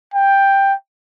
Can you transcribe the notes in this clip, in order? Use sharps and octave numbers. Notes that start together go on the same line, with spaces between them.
G5